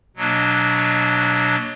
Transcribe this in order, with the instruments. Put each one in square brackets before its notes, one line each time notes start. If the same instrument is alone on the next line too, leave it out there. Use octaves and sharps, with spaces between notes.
[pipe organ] B2 F#3 A#3 D4